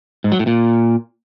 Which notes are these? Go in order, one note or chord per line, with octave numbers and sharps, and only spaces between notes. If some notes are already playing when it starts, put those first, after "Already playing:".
G#2
F#3
A2
A#2